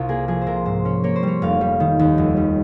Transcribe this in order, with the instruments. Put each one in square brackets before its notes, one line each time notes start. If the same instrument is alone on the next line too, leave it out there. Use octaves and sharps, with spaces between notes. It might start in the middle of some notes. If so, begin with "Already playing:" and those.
Already playing: [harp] C2 F4
A#3 G#4
F3 G#4
C5
C3 A#4
G#2 C5
C#4
A#3 C#5
C5
G3 C#5
F1 F5
G3
D#3
D#2
F1
G3